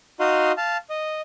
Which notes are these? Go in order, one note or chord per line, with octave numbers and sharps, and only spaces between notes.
D#4 F#4 D#5 F5 C6
F5 A5
D#5